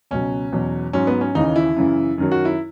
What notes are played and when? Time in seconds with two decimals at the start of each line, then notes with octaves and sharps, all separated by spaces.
0.11 C#2 B2 F#3 C#4
0.52 E2 B2 F#3
0.93 G#2 F#3 C#4
1.07 B3
1.21 C#4
1.35 D#2 C#3 E3 D#4
1.56 E4
1.76 F#2 C#3 E3
2.18 F#2 D#3 F#3
2.32 F#4
2.45 E4